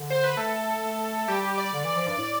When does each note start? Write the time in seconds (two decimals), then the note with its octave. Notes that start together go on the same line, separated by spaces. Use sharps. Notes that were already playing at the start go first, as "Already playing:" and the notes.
Already playing: D3
0.10 C5
0.24 B4
0.37 A3 A4
0.83 A3
1.28 G3 G4
1.43 G4
1.58 D5
1.73 D3
1.84 E3
1.96 F3
2.08 G2
2.18 A2